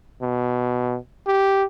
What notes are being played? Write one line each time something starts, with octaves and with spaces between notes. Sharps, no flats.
B2
G4